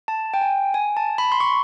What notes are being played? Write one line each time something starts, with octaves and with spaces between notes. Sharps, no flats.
A5
G5
G#5
G#5
A5
B5
C6
C#6